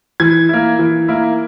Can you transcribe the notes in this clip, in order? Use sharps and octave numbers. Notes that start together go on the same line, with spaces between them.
E3 G#6
A#3 E4
E3
A#3 E4